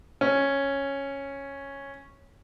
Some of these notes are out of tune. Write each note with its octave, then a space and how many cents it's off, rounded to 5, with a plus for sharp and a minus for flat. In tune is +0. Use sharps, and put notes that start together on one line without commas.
C#4 -5